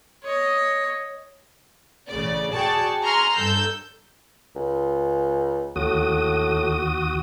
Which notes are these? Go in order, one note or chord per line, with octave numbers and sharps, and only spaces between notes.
C#5 D#5
A1 C#3 D5
F#4 G#4 D5 G5 A5 C#6
G#5 A#5 C6 C#6 F6
G2 A4 E6 G6
C#2
D#2 A2 F#4 D#6